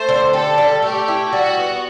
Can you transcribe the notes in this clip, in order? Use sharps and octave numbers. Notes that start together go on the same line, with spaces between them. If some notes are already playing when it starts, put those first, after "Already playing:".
Already playing: A3 C5
D3
G4 A4
G3
A3 G4
E4
G3 F#4
B3